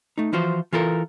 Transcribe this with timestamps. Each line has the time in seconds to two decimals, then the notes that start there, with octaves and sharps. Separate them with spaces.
0.18 A3 D#4
0.33 E3 F3 F4 F#4 C5
0.73 E3 F4 A4 A#4